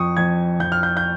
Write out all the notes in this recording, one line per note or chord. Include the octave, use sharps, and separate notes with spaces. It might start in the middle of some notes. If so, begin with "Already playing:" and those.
Already playing: F2 C#6 D#6
F2 G#6
F2 G6
F6
G6
G6